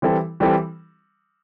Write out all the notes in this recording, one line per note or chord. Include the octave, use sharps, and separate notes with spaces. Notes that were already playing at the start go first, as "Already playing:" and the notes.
E3 G3 C4 E4 A4
E3 G3 C4 E4 A4